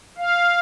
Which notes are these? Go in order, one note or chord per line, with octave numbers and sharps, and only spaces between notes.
F5